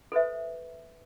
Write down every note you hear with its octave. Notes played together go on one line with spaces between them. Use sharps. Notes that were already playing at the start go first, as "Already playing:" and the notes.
A4 B4 C5 E5